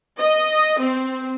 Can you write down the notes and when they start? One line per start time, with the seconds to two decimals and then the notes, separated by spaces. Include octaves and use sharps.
0.20 D#5
0.80 C4